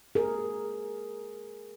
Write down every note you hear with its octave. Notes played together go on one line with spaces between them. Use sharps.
G#4 A#4